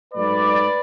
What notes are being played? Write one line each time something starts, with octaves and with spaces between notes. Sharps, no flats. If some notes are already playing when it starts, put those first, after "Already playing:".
G#2 F#3 A3 B4 D5